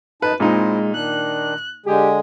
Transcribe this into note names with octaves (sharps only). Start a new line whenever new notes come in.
F#2 D#4 B4 A5
A#2 G#3 C4 D#4 E4
D#3 D4 F#6
D3 G#3 G4 G#4